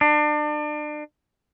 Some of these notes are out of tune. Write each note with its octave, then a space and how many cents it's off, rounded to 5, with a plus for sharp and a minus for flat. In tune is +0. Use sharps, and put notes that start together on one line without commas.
D4 +35